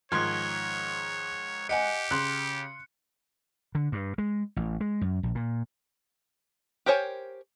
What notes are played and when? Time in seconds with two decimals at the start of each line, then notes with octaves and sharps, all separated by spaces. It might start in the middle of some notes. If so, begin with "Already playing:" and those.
0.12 G#2 D#3 F3 C#5 C6 F6 F#6 G#6
1.69 G4 D#5 F#5 G#5 C#7
2.11 C#3 C6 F#6
3.75 D3
3.92 G2
4.18 G#3
4.56 A1
4.81 G#3
5.01 F#2
5.23 A#1
5.35 A#2
6.86 G4 A#4 C5 C#5 G#5